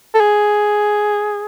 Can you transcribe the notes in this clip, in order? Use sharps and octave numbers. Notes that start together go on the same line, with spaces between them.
A4
G#4